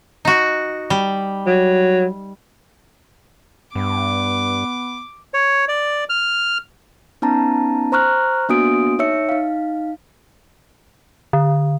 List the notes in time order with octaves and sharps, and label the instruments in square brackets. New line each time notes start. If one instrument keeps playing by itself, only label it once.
[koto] D#4 F#4
G3
[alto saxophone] F#3
[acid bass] G2 [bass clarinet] B3 [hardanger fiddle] D6
[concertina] C#5
D5
F6
[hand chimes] B3 C#4 D#4 A5 A#5
C5 A#5 C#6 F6 F#6
A#3 B3 D4 F#4 D#6 D7
D#4 C#5 E5 E6 C#7
D#4 F5
[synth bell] D3